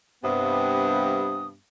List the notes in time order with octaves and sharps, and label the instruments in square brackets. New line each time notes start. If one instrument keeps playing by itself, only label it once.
[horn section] G2 [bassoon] C3 [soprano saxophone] B3 [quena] D#6